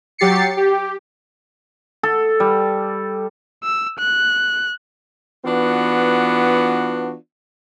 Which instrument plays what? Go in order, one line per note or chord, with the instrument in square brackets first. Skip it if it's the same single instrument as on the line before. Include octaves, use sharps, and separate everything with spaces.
[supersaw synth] F#3 G4 A6 C7 C#7
G4
[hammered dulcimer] A4
G3
[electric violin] E6
F#6
[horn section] E3 B3 D4 F4 F#4